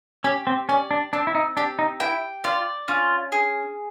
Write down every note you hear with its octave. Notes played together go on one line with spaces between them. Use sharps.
C#4 G4
C4
C#4 D5
D4
C4 D4
E4
D#4
D4 G4
D#4
E4 G5
F4 D5
C#4 F4
G#4